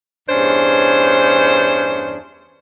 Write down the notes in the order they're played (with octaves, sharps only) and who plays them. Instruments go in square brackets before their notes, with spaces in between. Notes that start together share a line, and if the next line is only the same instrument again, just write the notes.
[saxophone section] E2 G2 C#4 D4 C5